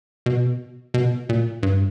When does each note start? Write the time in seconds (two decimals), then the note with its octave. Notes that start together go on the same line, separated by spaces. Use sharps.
0.26 B2
0.94 B2
1.29 A#2
1.63 G2